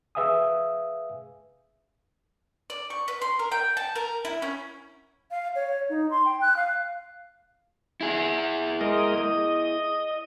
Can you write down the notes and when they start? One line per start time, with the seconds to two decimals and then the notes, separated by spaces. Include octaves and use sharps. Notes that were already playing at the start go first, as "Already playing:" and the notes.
0.15 G#4 B4 E5 F5 G#5 D#6
2.70 D5
2.90 C#6
3.08 B4
3.22 C6
3.39 A#4
3.52 G5
3.77 A5
3.95 A#4
4.25 E4
4.42 C#4
5.31 F5
5.55 C#5
5.90 D#4
6.11 C6
6.25 G5
6.42 F#6
6.57 F5
8.01 E4 G#4
8.81 G#3 A#4 D#5
9.18 D#5